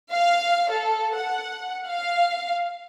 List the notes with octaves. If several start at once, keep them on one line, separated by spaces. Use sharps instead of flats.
F5
A4
F#5
F5